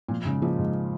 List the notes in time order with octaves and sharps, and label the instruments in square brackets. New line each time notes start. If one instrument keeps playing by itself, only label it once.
[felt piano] A#2 [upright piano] F3
[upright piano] G#2 [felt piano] C#3
[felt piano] F3 A#3 [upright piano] G#3
[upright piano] G#2